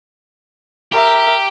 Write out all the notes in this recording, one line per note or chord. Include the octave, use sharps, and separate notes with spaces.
G4 A#4 E5